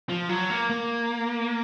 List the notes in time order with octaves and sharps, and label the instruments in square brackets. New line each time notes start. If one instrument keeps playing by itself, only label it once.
[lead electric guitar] F3
F#3
A#3
A#3